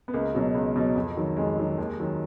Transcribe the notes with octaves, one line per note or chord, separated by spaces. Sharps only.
B3
C#2 A#3
B2 F#3
C#2
B2 F#3
F2
D#3 F#3
F2 G#3
D#3 F#3
D#2
D#3 F#3